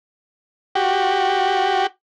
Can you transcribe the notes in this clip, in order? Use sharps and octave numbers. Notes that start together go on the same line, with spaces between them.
F#4 G4